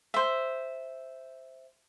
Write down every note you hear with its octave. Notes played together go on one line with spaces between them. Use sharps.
C5 E5